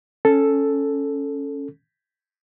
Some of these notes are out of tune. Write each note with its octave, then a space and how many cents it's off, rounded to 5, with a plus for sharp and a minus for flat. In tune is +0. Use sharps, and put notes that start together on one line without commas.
C#4 +0 A4 +0